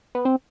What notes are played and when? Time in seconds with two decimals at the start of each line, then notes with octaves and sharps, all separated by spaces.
0.15 B3
0.25 C4